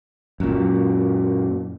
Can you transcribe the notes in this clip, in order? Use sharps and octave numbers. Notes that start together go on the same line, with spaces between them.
F#2 A#2